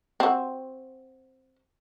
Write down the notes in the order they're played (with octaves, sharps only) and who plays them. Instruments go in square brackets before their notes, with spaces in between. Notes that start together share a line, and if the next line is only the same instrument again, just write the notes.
[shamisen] C4 F#4